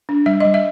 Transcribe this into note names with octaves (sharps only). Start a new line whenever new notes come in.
D4
G3 E5
G3 D#5
E5